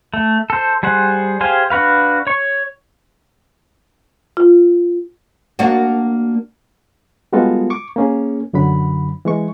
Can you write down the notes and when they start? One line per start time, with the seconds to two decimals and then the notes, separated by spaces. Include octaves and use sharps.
0.14 A3
0.50 A4 C5
0.83 G3 G#4 C5 F#5
1.41 G4 G#4 C5 F5 G#5
1.70 D4 F#4 B4 F5
2.27 C#5 C#6
4.37 F4
5.59 A#3 D4 F#4
7.33 G3 G#3 B3 F4 F#4 A4
7.70 C#6 D6
7.96 A#3 C#4 G#4
8.53 F#2 D3 F#3 B5
9.25 E3 G#3 C#6